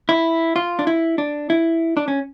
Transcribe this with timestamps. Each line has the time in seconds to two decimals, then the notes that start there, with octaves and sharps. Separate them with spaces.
0.09 E4
0.56 F4
0.79 D4
0.87 E4
1.18 D4
1.50 E4
1.97 D4
2.08 C#4